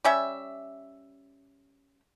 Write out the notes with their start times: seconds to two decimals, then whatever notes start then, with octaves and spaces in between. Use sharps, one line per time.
0.05 G3 C#4 E5